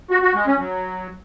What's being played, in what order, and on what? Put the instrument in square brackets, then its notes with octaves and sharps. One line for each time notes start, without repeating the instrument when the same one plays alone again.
[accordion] F#4
F#4
G#3
C#4
F#3